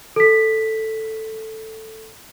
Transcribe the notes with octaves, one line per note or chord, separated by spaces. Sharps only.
A4 B6